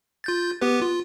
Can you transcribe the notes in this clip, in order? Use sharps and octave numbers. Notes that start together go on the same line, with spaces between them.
F4 G6 A6
B3 G4 B4
F4